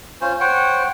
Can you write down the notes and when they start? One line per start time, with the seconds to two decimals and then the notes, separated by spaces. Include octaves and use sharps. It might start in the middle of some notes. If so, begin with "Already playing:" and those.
0.21 C#4 F4 C5
0.40 C5 C#5 F#5 G5